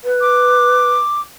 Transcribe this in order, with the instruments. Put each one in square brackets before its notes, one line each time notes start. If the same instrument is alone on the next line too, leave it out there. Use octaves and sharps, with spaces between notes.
[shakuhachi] B4
[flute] D6